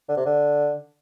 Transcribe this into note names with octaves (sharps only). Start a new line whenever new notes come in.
D3
C3
D3